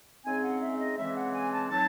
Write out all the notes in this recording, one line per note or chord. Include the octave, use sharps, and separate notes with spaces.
C#3 G#3 C4 D#4 G#5
F#5
E5
D#5
C#3 E3 G#3 C4 E5
F#5
G#5
A5
F#3 C4 D#4 A5